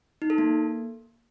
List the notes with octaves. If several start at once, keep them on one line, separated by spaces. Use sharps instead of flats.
D#4
A4
A#3